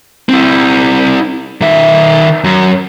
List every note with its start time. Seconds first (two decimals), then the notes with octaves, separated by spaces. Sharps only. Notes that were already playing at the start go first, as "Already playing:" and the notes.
0.29 C4 E4
1.61 D#3 E5
2.44 F#2